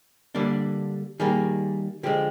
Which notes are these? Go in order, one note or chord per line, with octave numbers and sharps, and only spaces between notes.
D3 G3 A#3 D4
D#3 G3 A#3 G#4
D3 F3 G#3 G4